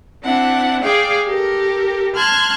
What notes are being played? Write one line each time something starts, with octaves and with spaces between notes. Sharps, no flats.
C4 D4 E4 F#5
G#4 D5 F5 G5
G4 A4 A#4
A5 C6 F6 F#6 G#6